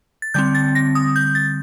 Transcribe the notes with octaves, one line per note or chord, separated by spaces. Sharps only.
A6
D3 G3 C4 G6
A6
A#6
D#6
G6
A6